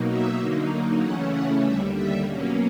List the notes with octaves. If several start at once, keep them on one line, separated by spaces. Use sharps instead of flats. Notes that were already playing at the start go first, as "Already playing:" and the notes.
Already playing: B2 F#3 A#3 D#4
E5
D3 F#3 A#3 D#4
C#3 E3 A3 C#4 F#5
F#5
D#2 D3 G3 E5
E5
B2 F#3 A#3 C#4